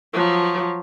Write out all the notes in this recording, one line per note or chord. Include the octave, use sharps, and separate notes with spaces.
F3 F#3